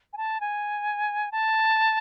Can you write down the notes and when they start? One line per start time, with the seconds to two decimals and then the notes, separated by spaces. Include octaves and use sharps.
0.13 G#5
0.17 A5
0.41 G#5
1.32 A5